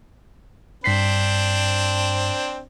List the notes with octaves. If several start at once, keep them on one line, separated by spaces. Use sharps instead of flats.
G2 C4 D4 C5 B6 C7